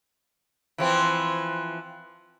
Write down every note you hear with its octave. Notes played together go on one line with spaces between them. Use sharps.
E3 F3 C4